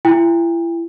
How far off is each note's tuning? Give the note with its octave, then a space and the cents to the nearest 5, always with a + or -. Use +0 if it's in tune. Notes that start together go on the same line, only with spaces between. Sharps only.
E4 +35 G5 +40